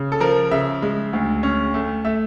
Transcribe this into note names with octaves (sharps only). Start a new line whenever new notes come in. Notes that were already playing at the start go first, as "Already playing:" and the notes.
Already playing: C#3
A4
F3 A#4
C#3 E5
G#3
D2
C#4
A3
A3 E5